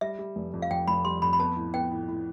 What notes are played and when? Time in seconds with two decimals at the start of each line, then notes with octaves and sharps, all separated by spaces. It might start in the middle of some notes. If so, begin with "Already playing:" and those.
0.01 G3 E5
0.19 G3
0.36 F1
0.54 F2
0.62 F5
0.70 F2 G5
0.88 F1 B5
1.05 G3 C6
1.22 F2 B5
1.33 B5
1.39 B3 A5
1.57 A2
1.74 B3 G5
1.91 A2
2.08 A2